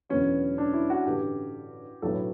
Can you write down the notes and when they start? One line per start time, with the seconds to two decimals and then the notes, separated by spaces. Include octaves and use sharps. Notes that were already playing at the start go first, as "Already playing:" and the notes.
0.09 E1 E2 D3 F#3 B3 C#4
0.58 D4
0.74 E4
0.90 F#4
1.06 A1 G2 D3 G4
2.02 B1 A2 F#3 B3 D4 A4